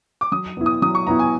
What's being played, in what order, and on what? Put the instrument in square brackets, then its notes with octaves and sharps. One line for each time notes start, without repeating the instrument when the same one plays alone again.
[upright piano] D6
[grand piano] F#3 [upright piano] D#6
[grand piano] B3 E4
[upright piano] D#6
[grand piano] F#3 [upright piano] D#6
[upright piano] C#6
[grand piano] B3 E4 [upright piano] A#5
[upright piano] G#5